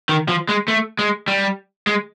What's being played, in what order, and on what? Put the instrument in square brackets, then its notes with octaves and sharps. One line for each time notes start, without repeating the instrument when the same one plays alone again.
[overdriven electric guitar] D#3
F3
G#3
A3
G#3
G3
G#3